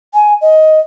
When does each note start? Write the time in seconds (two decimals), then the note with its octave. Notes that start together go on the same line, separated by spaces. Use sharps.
0.14 G#5
0.42 D#5